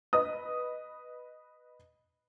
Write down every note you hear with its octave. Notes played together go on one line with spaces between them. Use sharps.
B4 D#5 D#6